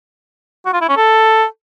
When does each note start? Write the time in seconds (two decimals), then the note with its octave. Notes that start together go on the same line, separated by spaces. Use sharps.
0.66 F#4
0.73 F4
0.81 E4
0.89 C#4
0.97 A4